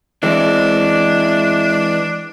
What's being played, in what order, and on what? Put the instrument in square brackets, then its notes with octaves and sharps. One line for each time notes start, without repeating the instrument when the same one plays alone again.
[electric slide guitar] E3 G#3 C4 [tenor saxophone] D4